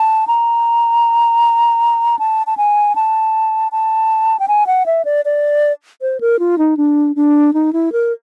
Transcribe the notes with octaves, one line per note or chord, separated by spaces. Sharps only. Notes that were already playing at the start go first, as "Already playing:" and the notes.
Already playing: A5
A#5
A5
A5
G#5
A5
A5
G5
G#5
F#5
E5
D5
D5
C5
A#4
F4
D#4
D4
D4
D#4
E4
A#4